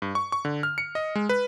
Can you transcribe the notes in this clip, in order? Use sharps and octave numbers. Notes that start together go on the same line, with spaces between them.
G2
C#6
C#6
D3
F6
C#7
D#5
G#3
B4